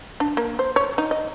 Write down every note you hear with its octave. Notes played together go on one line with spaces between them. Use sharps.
D4
A#3
C5
C#5
D#4
D#5